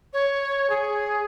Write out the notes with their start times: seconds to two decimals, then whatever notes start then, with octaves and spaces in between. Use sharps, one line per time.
0.13 C#5
0.70 G#4